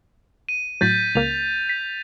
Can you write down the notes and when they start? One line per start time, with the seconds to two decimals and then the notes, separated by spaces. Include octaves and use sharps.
0.49 D#7
0.81 A2 F#3 G6 A6 B6
1.15 C#2 A#3 F7
1.69 B6